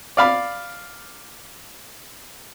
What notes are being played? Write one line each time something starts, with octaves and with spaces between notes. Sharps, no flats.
D5 F5 B5